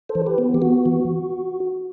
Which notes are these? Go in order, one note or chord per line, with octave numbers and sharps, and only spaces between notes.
A4 C5
E3
G4 B4
B3
G4
B3 F#4
E3